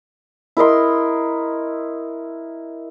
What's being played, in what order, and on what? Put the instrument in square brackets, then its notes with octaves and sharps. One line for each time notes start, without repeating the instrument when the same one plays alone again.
[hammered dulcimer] E4 A#4 D#5 C6